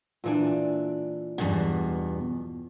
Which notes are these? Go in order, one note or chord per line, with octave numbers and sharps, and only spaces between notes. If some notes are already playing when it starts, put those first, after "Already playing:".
A#2 E3 D4
E2 G2 B2 F#5